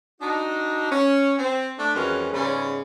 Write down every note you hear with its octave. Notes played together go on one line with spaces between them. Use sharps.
D4 D#4 F#4
C#4
C4
A3 D4
F2 E3 F#3 G#3 C#4 A#4
G#2 C#3 G3 B3 C#4